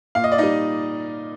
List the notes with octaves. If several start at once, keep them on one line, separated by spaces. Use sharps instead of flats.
A#2 F5
D#5
D5
G3 D#4 D#5